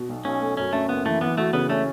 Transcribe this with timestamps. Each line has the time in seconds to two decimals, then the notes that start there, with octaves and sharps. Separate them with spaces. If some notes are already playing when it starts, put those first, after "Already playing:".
Already playing: B2
0.09 B1
0.25 B1 C#4
0.41 A3
0.57 F#2 C#4
0.73 A3 C#4
0.89 F#1 B3
1.06 E3 A3
1.21 E3 B3
1.38 A3 F#4
1.53 C#3 B3
1.69 A3 C#4